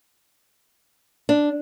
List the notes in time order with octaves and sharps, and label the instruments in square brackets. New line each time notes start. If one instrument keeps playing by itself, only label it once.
[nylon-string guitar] D4